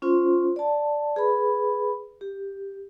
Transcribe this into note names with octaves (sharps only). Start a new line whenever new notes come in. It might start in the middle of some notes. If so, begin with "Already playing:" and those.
C#4 F4 C5 C6
D5 A5
G#4 B4 B5
G4